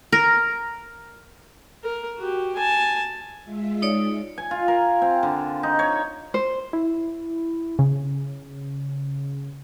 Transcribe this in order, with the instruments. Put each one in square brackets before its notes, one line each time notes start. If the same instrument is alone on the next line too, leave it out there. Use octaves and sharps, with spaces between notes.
[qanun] A#4
[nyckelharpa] A#4
F#4 G4
G#5 A5
[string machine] G#3 F4 E5
[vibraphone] D#4 C#5 D5
[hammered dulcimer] G#5
F4
A#4
C4
D3
D#4
C#5
[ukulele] C5
[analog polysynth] E4
C#3